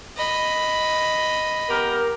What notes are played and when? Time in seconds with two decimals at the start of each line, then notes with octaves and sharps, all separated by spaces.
0.17 D#5 B5
1.70 B3 G4 A#4